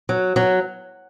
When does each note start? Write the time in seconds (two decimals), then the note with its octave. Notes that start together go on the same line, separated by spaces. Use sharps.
0.09 F#3
0.36 F#3